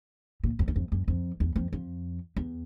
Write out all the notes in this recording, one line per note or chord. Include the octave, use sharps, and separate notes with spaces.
A#2
F2
E2
F2
F#2
F2
E2
F2
F2
E2